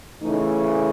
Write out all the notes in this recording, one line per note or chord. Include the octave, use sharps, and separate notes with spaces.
C#3 E3 A3 D#4